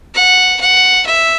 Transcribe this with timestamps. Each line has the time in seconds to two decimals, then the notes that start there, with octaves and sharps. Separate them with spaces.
0.14 F#5
0.60 F#5
1.06 E5